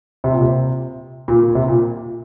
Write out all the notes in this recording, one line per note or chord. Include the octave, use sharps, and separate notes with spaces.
C3
A#2
C3
A#2
A#2
C3
A#2